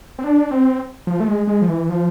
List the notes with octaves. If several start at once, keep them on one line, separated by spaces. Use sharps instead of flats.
C4
D4
C4
F3
A3
G#3
G#3
F3
E3
F3